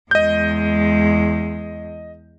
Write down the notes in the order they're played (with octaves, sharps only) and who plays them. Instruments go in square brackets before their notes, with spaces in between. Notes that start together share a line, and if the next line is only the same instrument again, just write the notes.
[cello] E2 G#3 [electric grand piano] D#5 G6